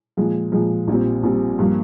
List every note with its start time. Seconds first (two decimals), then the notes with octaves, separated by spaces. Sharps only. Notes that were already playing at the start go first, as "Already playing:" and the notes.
0.17 A#2 F3 G#3
0.52 A#2 F3 G#3
0.88 A#1 A#2 G3 C4
1.23 A#1 A#2 G3 C4
1.59 G2 F3 A#3